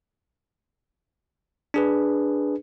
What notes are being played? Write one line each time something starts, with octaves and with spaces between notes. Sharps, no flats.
D4 G#4 B4